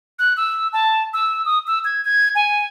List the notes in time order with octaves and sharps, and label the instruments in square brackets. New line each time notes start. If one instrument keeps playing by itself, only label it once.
[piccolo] F#6
E6
A5
E6
D#6
E6
G#6
G#6
G#5